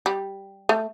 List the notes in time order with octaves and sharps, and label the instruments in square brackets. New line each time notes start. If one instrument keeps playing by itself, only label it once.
[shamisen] G3
A3